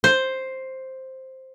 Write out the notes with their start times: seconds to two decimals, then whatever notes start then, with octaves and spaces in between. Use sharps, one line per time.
0.04 C5